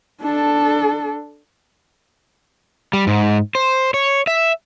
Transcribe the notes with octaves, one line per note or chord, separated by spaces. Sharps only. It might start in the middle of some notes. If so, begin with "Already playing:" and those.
D4 A4
G3
G#2
C5
C#5
E5